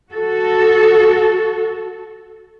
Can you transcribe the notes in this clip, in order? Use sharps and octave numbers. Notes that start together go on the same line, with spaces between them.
F#4 A4